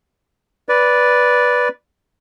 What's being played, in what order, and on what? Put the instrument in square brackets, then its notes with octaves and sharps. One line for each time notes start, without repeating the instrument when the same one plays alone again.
[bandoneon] B4 D5